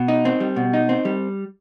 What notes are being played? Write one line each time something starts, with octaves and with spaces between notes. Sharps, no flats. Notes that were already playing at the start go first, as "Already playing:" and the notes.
Already playing: B2
D#4
C4
G3
B2
D#4
C4
G3